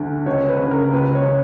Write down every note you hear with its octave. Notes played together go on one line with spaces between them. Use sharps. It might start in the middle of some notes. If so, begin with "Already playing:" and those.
Already playing: D2 D3
C#2 C#5
B4
C#3
A#4
C#2 B4
C#5
C#3